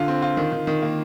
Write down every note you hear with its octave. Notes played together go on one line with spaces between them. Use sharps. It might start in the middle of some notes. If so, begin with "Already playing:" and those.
Already playing: D3 F4
C4
F4
D#3
D#3
D#3
A#3